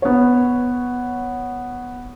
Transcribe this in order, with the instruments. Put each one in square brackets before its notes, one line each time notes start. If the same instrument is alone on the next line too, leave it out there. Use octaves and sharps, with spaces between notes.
[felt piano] B3 C#5